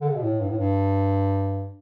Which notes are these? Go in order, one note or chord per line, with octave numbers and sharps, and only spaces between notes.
D3
C#3
B2
A2
G2
A2
G2